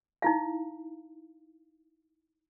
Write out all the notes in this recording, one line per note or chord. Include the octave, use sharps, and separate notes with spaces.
D#4 E4 F5